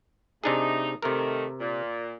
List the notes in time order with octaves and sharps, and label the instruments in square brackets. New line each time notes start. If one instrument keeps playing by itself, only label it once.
[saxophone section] A2 A3 D#4 [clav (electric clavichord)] C3 D4 G#4
[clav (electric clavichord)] C3 A#4 [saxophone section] D#3 A3
[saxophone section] A#2